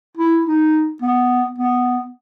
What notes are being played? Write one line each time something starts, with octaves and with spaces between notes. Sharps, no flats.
E4
D#4
B3
B3